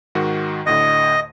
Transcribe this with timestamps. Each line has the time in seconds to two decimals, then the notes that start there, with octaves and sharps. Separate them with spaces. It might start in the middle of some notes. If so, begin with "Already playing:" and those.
0.15 G#2 D#3 F#4
0.66 D2 A2 D3 D#5